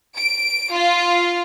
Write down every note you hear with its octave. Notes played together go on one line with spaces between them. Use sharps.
D7
F4